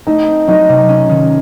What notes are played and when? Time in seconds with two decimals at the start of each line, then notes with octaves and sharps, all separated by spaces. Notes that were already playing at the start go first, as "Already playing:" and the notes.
0.07 A3 D#4 D#5
0.27 C4
0.48 F#3 D#4 D#5
0.69 C3
0.89 C#4
1.09 D#3